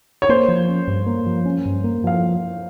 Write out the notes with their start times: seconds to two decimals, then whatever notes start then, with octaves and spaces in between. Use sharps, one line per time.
0.22 C#5
0.29 A#3 C5
0.48 F3
0.68 C#4
0.87 G2
1.06 A#3
1.26 F3
1.45 C#4
1.65 G2
1.84 A#3
2.04 F3 F5